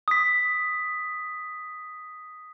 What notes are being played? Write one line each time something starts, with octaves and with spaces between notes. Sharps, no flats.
D#6 B6